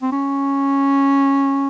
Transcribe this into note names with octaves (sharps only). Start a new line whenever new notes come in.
C4
C#4